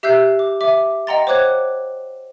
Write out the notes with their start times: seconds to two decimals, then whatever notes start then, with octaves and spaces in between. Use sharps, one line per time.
0.03 G4 E5 E6 F#6 G6 C7
0.39 D6
0.61 E5 D6
1.07 D#5 F#5 G5 A#5 C6 A6
1.27 C5 C#5 D6 F#6 G#6